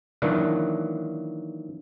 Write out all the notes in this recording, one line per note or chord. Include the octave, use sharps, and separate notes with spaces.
D#3 E3 F#3 A#3 D4